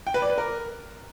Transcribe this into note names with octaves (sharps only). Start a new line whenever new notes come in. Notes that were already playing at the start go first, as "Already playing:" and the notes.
G5
B4
D5
B4
A#4